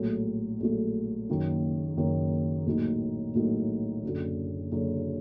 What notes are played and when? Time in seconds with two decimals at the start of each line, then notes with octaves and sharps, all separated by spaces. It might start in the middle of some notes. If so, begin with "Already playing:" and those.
Already playing: A#1 A2 F#3 A3
0.60 A#1 A2 F#3 A3
1.29 F#1 F#2 D#3 F#3 A#3
1.97 F#1 F#2 D#3 F#3 A#3
2.66 A#1 A2 F#3 A#3 D#4
3.35 A#1 A2 F#3 A#3 D#4
4.03 F#1 F#2 D3 F#3
4.72 F#1 F#2 D3 F#3